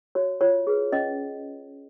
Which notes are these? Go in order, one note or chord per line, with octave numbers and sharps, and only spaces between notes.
F#4 C#5
F4 C#5
G#4 B4
C#4 D#5